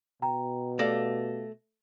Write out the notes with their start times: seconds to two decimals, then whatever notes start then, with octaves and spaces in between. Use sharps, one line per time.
0.22 B2 G5 A#5
0.79 A3 G4 D5 F5 A#6